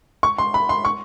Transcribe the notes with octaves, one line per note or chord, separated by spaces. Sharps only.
C#6
C6
B5
C6
C#6